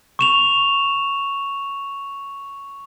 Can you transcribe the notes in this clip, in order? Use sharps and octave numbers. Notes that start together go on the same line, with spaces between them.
C#6 E7 F7